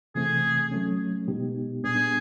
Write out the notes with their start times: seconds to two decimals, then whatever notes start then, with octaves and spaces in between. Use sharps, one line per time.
0.15 C3 E3 A3 C4 G#4
0.71 F#3 A3 C#4
1.28 B2 G#3 B3 D#4 G4
1.84 A#2 G3 B3 D4 G#4